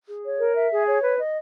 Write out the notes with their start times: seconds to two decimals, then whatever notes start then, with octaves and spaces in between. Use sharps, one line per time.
0.08 G#4
0.24 C#5
0.39 A#4
0.56 E5
0.71 G#4
0.87 C#5
1.03 B4
1.20 D#5